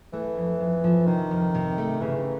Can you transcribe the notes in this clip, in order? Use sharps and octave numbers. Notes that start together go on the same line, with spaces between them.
E3 A3
F2
F2
F3
C3 D#3
F2
C3
A3
C#3 E3